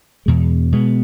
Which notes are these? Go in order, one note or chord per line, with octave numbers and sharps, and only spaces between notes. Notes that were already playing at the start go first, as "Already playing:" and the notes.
E2 B2 G#3
B2 G#3 B3